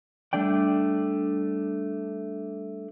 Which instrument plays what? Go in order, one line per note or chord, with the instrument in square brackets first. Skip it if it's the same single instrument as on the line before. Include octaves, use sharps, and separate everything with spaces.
[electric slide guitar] G3 A3 D4 D5 G5